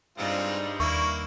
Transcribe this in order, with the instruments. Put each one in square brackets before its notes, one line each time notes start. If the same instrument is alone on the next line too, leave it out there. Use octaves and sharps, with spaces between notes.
[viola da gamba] G2 G3 D#4 [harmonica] G#3 C4 F4
[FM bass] D#2 [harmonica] A#3 E4 [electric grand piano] C#6